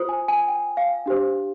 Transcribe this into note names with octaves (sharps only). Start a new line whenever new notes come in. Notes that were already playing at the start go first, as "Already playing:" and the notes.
Already playing: F4 C5 D#6
G#5
G#5
G5
F5
D4 G4 C5